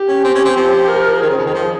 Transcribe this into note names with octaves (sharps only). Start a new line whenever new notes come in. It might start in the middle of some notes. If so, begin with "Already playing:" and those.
Already playing: G4
C#4
C4
C#4
C4
F3 G4
A#4
D#3 G#4
C#3
F2
D#3
F3